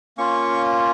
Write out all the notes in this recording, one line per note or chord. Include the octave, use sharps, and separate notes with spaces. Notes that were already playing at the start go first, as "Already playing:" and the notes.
A#3 C#4 F4 C#6